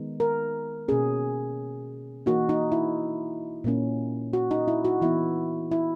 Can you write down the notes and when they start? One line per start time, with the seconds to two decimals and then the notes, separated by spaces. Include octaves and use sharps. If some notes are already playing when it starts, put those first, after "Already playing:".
Already playing: D#3 G#3 B3 D#4
0.20 A#4
0.88 B2 A#3 C#4 G#4
2.26 E3 A#3 D#4 F#4
2.49 D#4
2.72 E4
3.64 A#2 A#3 C#4
4.33 F#4
4.51 D#4
4.68 E4
4.85 F#4
5.01 E3 B3 D#4 E4
5.72 E4